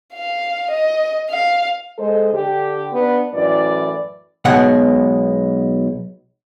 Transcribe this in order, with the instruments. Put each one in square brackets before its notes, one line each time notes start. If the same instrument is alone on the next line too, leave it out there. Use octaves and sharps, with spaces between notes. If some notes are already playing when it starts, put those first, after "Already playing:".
[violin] F5
D#5
F5
[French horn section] G#3 A4 C5 D#5
D3 G4
B3 D4
F#2 A2 E3 D5
[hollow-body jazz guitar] B1 B2 G#3 F#5